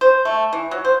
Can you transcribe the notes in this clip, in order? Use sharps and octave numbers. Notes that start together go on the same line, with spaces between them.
C5
A3
E3
F#3
C5